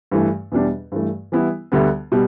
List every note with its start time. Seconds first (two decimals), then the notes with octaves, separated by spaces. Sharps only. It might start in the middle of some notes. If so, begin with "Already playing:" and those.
0.11 G2 E3 A3
0.52 E2 B2 G3 D4
0.92 G2 E3 A3
1.32 E3 G3 B3 E4
1.72 D2 D3 G3 B3
2.12 B2 G3